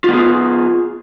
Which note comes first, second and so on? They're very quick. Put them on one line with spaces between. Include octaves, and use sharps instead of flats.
F4 B3 G#4